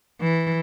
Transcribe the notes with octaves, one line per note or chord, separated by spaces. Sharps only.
E3